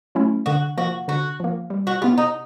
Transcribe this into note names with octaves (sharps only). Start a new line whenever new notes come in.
F#3 A3 C#4 E4
D3 F#4
F3 A#3 F#4
D3 F#4
F3 A#3
G3
F#4
B3 E4 F4 G4
D#4